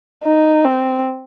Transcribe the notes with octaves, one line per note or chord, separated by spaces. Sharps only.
D#4
C4